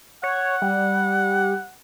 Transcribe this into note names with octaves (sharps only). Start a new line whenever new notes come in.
C#5 F#5
G3